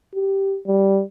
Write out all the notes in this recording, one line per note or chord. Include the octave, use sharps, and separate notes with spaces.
G4
G3